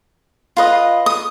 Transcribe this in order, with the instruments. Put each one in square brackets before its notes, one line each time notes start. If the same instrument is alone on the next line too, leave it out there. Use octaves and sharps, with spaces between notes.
[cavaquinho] F4 B4 D#5
D#6